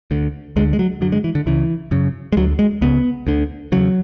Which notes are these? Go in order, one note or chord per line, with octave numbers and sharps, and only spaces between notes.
D2 D3
D2 D3 G#3
G#3
F#3
F#2 D3 F#3
G#3
E3
D3
C#2 C#3 E3
F#2 C#3
G#3
D2 D3 F#3
G#3
C#2 C#3 B3
D2 D3
E2 C#3 F#3